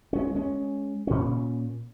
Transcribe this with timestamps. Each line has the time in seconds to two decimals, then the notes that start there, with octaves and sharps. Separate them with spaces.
0.13 G#3 C#4
0.35 G#3 C#4
1.07 A#2 C#4